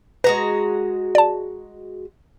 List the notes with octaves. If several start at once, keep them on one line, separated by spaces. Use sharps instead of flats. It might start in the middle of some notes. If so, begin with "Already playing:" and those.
G#3 F#4 B4 A#5
D5 A5